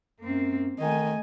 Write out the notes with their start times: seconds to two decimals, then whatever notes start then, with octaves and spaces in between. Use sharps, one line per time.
0.20 F#2 A#3 C4
0.79 D#3 A3 D#5 G#5